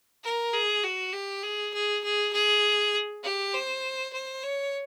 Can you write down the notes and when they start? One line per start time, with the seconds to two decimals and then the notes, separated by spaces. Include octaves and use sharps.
0.24 A#4
0.53 G#4
0.83 F#4
1.13 G4
1.43 G#4
1.74 G#4
2.04 G#4
2.33 G#4
3.24 G4
3.54 C5
4.13 C5
4.43 C#5